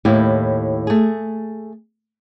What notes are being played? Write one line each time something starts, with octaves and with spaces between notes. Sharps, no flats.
D#2 A2 E4 G4
A3 G#4